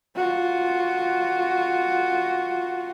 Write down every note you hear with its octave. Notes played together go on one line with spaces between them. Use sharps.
F4 F#4